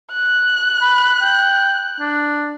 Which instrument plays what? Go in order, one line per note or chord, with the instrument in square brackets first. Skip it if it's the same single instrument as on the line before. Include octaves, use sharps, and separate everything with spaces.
[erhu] F#6
[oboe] B5
G5
D4